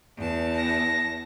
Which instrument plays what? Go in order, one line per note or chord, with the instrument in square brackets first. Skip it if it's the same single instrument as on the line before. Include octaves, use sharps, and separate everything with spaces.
[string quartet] E2 A5
[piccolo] A#6